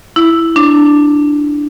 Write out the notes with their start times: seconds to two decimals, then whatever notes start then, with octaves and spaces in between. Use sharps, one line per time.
0.16 E4
0.56 D4